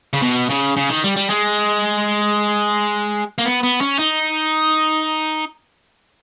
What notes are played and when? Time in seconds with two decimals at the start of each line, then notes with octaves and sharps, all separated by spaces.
0.13 C#3
0.23 B2
0.50 C#3
0.77 C#3
0.90 D#3
1.04 G3
1.17 G3
1.30 G#3
3.39 A#3
3.45 B3
3.63 B3
3.81 C#4
3.99 D#4